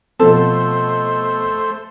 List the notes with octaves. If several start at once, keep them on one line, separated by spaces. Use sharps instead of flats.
B2 F3 A3 C4 A4 C5